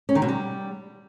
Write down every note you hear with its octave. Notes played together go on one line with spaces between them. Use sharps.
C#4
D#3
B2
G3